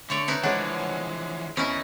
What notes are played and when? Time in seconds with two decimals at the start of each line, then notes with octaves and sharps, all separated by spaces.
0.10 D3 A3 C#5 D5
0.28 D#4 E4 B4
0.43 E3 F3 G#3 D4 C#5 F#5
1.57 E2 C#4 E4 A#4 D#5